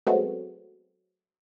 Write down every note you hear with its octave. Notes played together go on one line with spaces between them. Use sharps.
F#3 G#3 A3 B3 C4 F#4